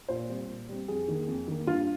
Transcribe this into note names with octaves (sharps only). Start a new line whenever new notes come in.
A#2 C5
G3 C4
A#2
G3 C4
F2 G#4
D#3 A#3
F2
D#3 A#3
G2 F4